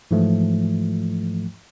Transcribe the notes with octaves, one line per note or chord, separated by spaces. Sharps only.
G#2 E3 F3 A3